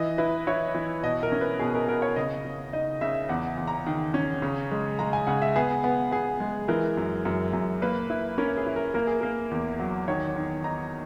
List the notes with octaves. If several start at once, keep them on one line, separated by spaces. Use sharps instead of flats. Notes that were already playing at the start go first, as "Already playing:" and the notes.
Already playing: E3 D#5
E4 B4
E4 C#5
E3
B2 D#5
A#4
C#4
B4
B2 G#4
A#4
B2 A#4
C#5
C#3 D#5
C#3
D#4 D#5
C#3 E5
E2 F#5
E2
A#5
D#3
C#4
C#3
G#3
G#3 A#5
G#5
C#3 F#5
E5
B3 G#4
B3
B3 G#4
G#3
E3 A#4
F#2
F#2 A#4
F#2
A#3 B4
E4
C#4 A#4
G#4
E4
A#4
A#3 A#4
G#4
A#3 A#4
E2
F#3
D#3 C#5
D#3
D#4 A#5